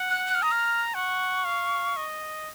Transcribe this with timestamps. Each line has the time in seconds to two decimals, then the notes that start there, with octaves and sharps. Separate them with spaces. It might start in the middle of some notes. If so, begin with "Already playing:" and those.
Already playing: F#5
0.09 F#6
0.26 F#6
0.35 F6
0.43 A#5 D#6
0.51 F6
0.94 F#5 C#6
1.45 F5
1.96 D#5